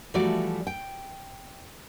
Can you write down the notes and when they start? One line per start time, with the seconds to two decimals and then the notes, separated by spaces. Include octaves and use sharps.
0.14 E3 F3 G3 A3 F#4 D5
0.67 G5